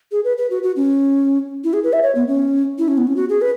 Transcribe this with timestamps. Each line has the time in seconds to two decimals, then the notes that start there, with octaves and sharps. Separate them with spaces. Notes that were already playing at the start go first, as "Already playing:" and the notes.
0.12 G#4
0.24 B4
0.38 B4
0.51 F#4
0.63 F#4
0.76 C#4
1.64 E4
1.73 G#4
1.84 B4
1.93 E5
2.03 C#5
2.15 B3
2.28 C#4
2.78 E4
2.88 C#4
2.98 B3
3.07 C#4
3.16 F#4
3.29 G#4
3.42 B4